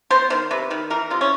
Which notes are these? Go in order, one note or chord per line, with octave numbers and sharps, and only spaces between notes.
B3 C5
D#3 C5
C3 B4
D#3 B4
E3 A#4
C3 F4
C#4